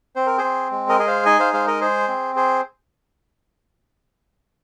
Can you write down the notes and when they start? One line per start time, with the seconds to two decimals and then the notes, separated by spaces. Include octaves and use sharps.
0.16 C4 C5
0.26 A#4
0.38 G#4 C5
0.44 C4
0.71 G#3
0.89 A#4 D#5
0.99 G#4 D#5
1.07 C5 F5
1.25 D#4 D#5 G#5
1.39 C5 F5
1.54 G#3 C5 F5
1.67 A#4 D#5
1.80 G#4 C5
2.08 C4
2.36 G#4 C5